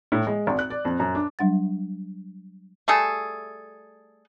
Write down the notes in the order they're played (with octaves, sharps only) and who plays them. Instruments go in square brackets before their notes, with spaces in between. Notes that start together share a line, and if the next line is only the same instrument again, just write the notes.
[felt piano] A2
G#3
G#1
F#6
D5
F2
F#2
D4
[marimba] F#3 G3 D4 F#5 A6
[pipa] G3 A3 G#4 A4